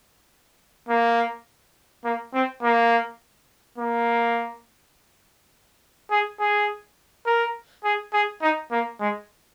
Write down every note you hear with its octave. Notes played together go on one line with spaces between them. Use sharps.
A#3
A#3
C4
A#3
A#3
G#4
G#4
A#4
G#4
G#4
D#4
A#3
G#3